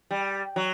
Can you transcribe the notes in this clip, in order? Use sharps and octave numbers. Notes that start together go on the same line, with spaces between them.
G3
F#3